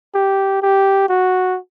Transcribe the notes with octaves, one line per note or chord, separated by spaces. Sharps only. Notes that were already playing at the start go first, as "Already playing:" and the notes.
G4
G4
F#4